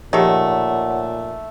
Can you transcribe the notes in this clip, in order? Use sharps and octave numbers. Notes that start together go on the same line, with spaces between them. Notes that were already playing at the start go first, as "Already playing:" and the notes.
A#2 D#3 F3 A3 G4 G#4 C#5 F#5